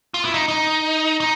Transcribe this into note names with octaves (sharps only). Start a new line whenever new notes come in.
F4
E4
D#4
D#4
D#4